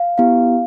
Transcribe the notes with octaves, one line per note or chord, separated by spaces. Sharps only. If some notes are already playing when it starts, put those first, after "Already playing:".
Already playing: F5
B3 E4 G4 F5